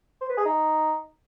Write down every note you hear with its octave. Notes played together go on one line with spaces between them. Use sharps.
C5
B4
G#4
D#4